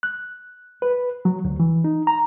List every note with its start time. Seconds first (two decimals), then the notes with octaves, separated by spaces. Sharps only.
0.03 F#6
0.82 B4
1.25 F#3
1.45 D2
1.60 E3
1.84 D#4
2.07 A#5